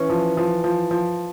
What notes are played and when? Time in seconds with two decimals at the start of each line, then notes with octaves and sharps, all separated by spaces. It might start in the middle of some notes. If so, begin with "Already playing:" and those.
Already playing: E3 C#4
0.10 F3
0.37 F3
0.64 F3
0.91 F3